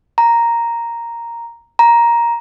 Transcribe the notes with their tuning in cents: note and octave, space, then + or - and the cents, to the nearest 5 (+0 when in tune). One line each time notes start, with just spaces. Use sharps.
A#5 +0
A#5 +10